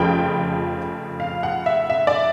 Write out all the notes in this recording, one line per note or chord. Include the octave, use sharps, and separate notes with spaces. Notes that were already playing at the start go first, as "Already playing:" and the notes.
Already playing: F1 F2 C#3 F3 G5
F5
F#5
E5
E5
D5